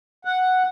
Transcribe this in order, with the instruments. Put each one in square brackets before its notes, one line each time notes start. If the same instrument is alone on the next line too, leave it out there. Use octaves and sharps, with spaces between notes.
[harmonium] F#5